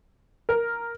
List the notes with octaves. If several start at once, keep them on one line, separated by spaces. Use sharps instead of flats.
A#4